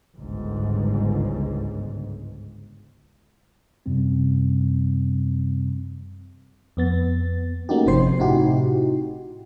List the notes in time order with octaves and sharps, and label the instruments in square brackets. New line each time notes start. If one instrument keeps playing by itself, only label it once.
[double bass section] G1 C#2 G#2
[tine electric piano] F#2 C3 G3 C4
[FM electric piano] F2 B3 A6
A3 A#3 C#4 D#4 F#4 G4
G1 C3 F3 C5 C7
A2 C3 D#4 E4 F#4 G4